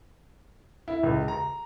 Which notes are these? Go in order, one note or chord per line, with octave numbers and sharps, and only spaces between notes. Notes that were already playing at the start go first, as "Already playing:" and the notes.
E4
C#2
A#5